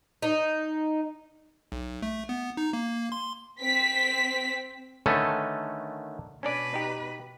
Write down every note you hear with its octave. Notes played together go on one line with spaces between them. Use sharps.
D#4
B1
A3
B3
D#4
A#3
C6
C4 B6
D3 D#3 A3 C#4 A4 B4
B2 C#4 D4 B4 D5
D#4 G4